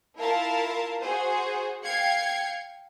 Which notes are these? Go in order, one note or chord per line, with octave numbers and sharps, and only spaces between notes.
E4 F4 A#4 F5 A5
F#4 G#4 C5
F5 G5 G#6 C7 C#7